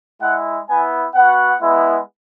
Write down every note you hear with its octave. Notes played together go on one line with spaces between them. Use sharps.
G#3 E4 F#5
B3 E4 G#5
B3 F#4 F#5
G#3 B3 E4